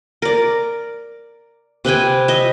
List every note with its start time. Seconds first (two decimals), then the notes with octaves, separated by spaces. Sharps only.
0.22 A#4 D5
1.85 C3 B4 G5 G#5
2.28 D#5 E5